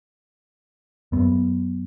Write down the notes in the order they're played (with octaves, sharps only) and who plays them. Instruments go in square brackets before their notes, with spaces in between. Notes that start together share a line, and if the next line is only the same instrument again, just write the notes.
[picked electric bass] F#2 B3